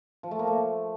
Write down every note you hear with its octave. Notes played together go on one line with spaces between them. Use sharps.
F3
A3
A#3
A3